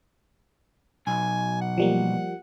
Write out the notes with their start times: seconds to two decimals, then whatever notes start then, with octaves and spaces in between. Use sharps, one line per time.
1.07 B1 G#5
1.61 F#5
1.78 F3 G3 A#3